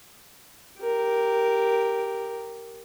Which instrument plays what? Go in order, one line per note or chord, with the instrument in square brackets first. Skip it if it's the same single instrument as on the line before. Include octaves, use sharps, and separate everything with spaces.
[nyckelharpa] G4 A#4